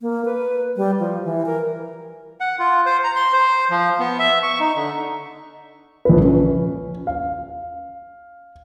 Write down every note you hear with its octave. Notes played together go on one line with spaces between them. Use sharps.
A#3
B4
G3
F3
E3
A#4
F#5
F4
C5
A#5
C6
C5
F3
B3
E5
C#6
D#4
D3
A#1 B4
C#4
F5